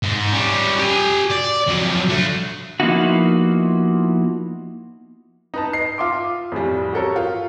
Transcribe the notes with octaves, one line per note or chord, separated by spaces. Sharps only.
G#2 G#3
G3 C#4
G4 G#5
D5
F2 F#3
D3 A3
F3 A#3 B3 D#4 E4 F#4
D#4 B4 A5
D#5 C7
F4 E5 C6 D6
F2 A2 E3 G3
F#4 G4 A4 A#4 C#5
F4